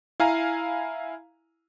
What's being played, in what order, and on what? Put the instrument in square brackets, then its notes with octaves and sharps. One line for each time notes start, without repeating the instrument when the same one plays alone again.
[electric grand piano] E4 F5 G#5 A#5